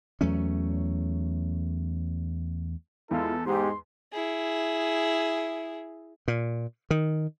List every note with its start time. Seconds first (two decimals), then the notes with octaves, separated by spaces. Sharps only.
0.21 E2 F#3 A3 C#4
3.11 E2 G#3 E4 F4 A4
3.46 G#2 G4 C6
4.13 E4 G#4
6.28 A#2
6.91 D#3